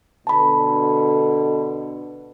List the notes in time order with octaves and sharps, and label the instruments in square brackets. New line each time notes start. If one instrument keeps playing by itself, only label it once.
[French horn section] B2 D3 [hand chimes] A5 B5